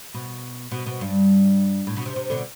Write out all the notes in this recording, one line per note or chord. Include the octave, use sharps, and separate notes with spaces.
B2
B2
B2
G2
A2
B2
C3
C3
B2 D3